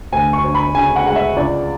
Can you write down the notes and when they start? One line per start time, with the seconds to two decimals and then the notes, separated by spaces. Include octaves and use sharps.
0.12 D2 G#5
0.33 C#6
0.44 D2
0.55 B5
0.74 C#3 G#5
0.96 F#5
1.06 G#3 F#5
1.16 E5
1.36 C#2 D5